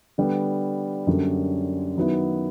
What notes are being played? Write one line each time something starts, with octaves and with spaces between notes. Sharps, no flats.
D3 G3 B3
F#2 D3 G3 A#3 C#4
D#3 F#3 B3 E4